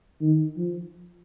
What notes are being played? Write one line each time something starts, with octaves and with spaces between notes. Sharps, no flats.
D#3
F3